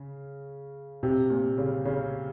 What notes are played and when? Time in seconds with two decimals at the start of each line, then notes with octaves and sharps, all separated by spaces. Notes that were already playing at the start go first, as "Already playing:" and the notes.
Already playing: C#3
1.03 C3
1.30 A#2
1.58 C#3
1.85 C#3